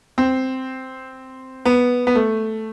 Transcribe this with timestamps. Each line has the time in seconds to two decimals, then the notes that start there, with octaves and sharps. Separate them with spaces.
0.18 C4
1.65 B3
2.07 B3
2.15 A3